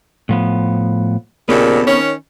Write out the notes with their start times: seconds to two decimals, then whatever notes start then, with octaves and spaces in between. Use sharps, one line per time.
0.29 A2 F3 B3
1.49 D#2 A#2 C#3 B3 C4 A4
1.87 D#3 C#4